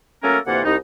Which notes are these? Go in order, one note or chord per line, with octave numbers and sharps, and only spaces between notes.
F#3 A3 A#3 C#4 A4 A#4
D2 C3 E3 A#3 F4 F#5
C2 D#4